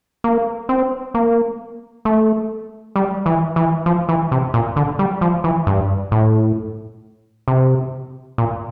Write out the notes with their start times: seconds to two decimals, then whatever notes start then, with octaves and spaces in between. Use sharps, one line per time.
0.24 A#3
0.69 C4
1.14 A#3
2.05 A3
2.96 G3
3.26 E3
3.56 E3
3.86 F3
4.09 E3
4.32 C3
4.54 A#2
4.76 D3
4.99 G3
5.21 F3
5.44 E3
5.67 G2
6.12 A2
7.48 C3
8.38 A#2